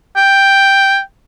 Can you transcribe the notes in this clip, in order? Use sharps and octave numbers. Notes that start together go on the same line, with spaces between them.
G5